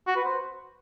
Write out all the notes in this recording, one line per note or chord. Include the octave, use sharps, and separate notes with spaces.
F#4
B4
C5